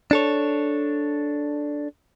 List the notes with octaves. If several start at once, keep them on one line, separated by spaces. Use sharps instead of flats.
D4 A4 C#5